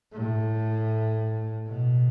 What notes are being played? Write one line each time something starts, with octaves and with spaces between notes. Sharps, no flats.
A2
B2